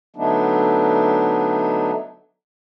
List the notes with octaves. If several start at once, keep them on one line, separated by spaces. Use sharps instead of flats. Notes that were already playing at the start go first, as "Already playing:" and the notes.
D3 F#3 A3 B3 D4 D#4